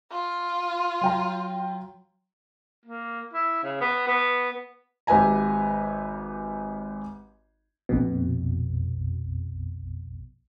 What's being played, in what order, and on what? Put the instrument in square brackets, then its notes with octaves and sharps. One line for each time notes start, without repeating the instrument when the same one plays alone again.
[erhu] F4
[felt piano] F#3 G5 A#5
[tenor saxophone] A#3
E4
C#3
B3
B3
[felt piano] G#1 G4 B4 E5 G#5 A#5
[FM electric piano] A#1 F2 B2